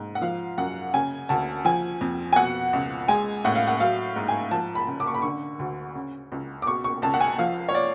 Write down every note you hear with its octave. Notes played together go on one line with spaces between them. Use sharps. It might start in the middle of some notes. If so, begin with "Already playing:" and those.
Already playing: G#2
F#5
F3 F5
F#2 F#5
C#3 G#5
D2 A5
F3 G#5
F2
G#5
B2 F#5
C#2
G#3 G#5
A2 F#5
F5
F#5
F#3 F5
G#2
G#5
F3 A5
B5
C#3
D6
C#6
B5
D3 C#6
D2
C#3
C#2
D6
B2 C#6
C#6
C#2 A5
F#5
G#5
F3 F5
C#5
D5